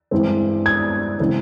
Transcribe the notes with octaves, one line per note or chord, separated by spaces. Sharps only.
G2 E3 G#3 C4
G#6
C#3 E3 G#3 C4